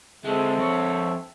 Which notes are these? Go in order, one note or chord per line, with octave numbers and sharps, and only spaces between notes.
D3 G#3 C4 A4 E5
F2 C#5